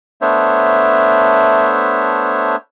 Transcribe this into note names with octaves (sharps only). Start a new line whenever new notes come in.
A3 B3 D4 C5 C#5 E5